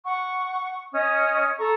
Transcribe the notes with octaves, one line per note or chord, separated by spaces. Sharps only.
F#5 C#6
C#4 D#5 D#6
A4 A#5 C#6